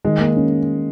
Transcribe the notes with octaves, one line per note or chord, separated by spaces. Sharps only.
D#3 G#3
A#3
C#4